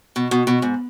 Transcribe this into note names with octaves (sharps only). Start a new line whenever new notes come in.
B2
B2
B2
G#2